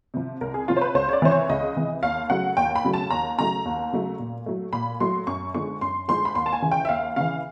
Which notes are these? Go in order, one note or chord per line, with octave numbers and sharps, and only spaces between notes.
C3 F3
C2 A#4
G#4
C3 F3 F4
C5
B4
C#2 C5
C#5
D5
C3 E3 C5
C#5
C#2 D#5
C3 E3
D#2 F5
C#3 F#3 A3 F#5
D#2 G5
B5
C#3 F#3 A3
A5
D#2 A#5
C#3 F#3 A3 A#5
D#2
C#3 F#3 A3
A#2
F#3 A3
A#2 B5
F#3 A3 C6
F#2 C#6
D3 F3 G#3 C#6
F#2 C6
D3 F3 G#3 C6
B5
D#2 C6
A5
G#5
C#3 E3
G5
E5
D#2 F5
C#3 E3 F5